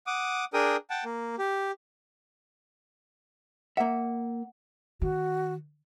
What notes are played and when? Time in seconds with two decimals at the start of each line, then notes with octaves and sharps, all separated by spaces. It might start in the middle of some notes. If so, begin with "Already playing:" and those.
0.07 F#5 D6 D#6
0.54 D4 G#4 A#4 G5 D#6
0.90 F#5 G5 A5
1.05 A#3
1.39 G4
3.77 A#3 E5 F#5
5.02 D#3 F#4